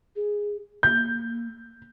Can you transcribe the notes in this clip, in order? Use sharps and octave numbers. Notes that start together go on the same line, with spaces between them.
G#4
A#3 G6